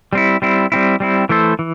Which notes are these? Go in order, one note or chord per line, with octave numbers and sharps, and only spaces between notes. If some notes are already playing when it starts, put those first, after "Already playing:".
G3 C4 E4
G3 C4 E4
G3 C4 E4
G3 C4 E4
E3 A3 E4 A4 C5
E3